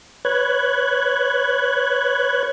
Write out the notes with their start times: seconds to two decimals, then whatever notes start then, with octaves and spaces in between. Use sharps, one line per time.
0.25 B4 C#5 F#6 G#6